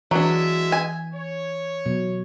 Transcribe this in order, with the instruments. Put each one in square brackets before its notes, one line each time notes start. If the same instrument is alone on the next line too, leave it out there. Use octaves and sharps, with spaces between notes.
[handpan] E3 [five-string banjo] F#3 D4 [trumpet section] G#3 E5
[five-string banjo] G#5
[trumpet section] C#5
[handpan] B2 F#3